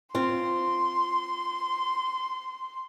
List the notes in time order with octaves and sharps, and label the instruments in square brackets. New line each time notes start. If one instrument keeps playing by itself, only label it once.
[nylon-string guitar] C4 F4 [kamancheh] C6